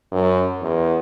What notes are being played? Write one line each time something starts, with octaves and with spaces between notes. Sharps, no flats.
F#2
E2